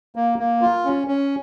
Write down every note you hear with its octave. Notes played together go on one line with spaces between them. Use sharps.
A#3
A#3
F4
C#4
C#4